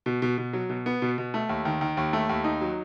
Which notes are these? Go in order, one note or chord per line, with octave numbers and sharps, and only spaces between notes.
B2
B2
B2
F#3
B2
B3
B2
B2
A3
D#2
D#3
D#3
D#2
A3
D#2
D#4
F#3